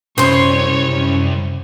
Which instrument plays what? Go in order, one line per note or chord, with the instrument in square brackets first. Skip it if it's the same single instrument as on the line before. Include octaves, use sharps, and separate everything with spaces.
[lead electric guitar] C2 [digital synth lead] F#2 [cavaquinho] C5 C6 [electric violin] C#5